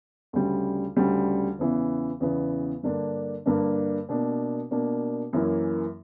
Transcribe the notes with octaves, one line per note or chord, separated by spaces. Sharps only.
D2 C#3 G3
D2 C#3 G3
E2 C#3 E3 B3
E2 C#3 E3 B3
G2 D3 A#3 D4
G2 D3 A#3 D4
B2 A#3 D4
B2 A#3 D4
F#2 E3 A#3 C#4 E4